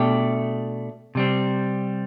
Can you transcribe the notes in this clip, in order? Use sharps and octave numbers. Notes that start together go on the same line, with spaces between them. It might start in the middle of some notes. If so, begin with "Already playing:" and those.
Already playing: B2 A3 D4 G4
C3 G3 C4